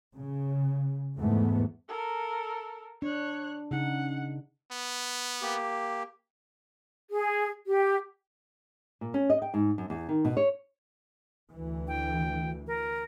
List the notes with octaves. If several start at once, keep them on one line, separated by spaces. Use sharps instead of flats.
C#3
E2 G#2 A3 B3
A4 A#4
D4 C#5 F#6
C#3 D#4 F#5
B3
A#3 G4
G#4
G4
A#2
C#4
D#5
G5
G#2
F#2
E2
D#3
B2
C#5
D2 E3
G5
A#4